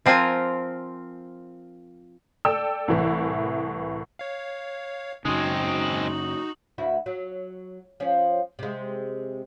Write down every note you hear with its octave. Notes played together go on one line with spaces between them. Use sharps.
F3 C4 F4 A#4 G#5
A4 D5 G5 E6
C2 A2 E3 E4
C#5 F5
F#2 C#3 G#3 C4 D#4 F#4 D#6
F#7
D2 E4 F#4
F#3
F3 C#4
C3 G#3